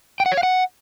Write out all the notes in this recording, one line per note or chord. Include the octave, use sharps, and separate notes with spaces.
G5
F#5
C#5
F5
F#5